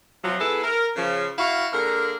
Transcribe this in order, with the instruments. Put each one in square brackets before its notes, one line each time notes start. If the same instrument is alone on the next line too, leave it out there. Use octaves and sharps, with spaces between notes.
[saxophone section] C3 F3 F#3
B3 E4 G#4 A4
A#4
C#3 F3
E4 F#4 F5
D3 A#3 G#4 A#4